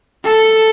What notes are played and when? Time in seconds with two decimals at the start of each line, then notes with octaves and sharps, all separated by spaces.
0.24 A4